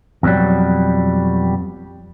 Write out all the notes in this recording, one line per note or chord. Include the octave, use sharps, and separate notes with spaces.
F2 B2 E3 F#3 G3